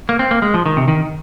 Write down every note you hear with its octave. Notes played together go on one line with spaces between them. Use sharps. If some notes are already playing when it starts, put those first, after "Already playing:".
A#3
C4
A#3
G#3
F3
D#3
C3
D#3